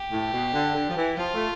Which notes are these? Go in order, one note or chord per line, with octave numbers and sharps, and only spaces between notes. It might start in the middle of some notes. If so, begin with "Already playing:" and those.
Already playing: G4
A2
B2
D3
D3
F3
E3
F3 F4
A3